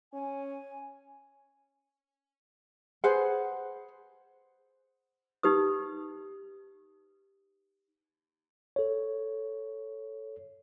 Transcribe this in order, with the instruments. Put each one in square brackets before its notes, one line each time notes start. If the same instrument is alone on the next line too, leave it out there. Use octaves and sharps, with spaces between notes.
[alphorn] C#4 [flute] G#5
[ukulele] G#4 B4 C5 F#5
[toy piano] D#4 G4 B4 D#6
[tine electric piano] A4 C#5